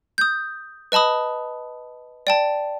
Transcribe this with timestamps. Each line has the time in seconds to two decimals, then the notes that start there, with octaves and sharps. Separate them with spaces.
0.18 D#6 G6
0.92 B4 D#5 A5 B5 D#6
2.27 D5 G5 A5